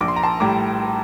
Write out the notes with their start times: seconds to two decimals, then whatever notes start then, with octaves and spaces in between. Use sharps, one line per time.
0.01 A#1 D6
0.08 C6
0.16 A#5
0.23 A5 C6
0.40 A2 G3 A#5 D6